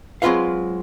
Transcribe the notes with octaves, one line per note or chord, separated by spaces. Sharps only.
F#3 G#3 C4 F4 B4 F5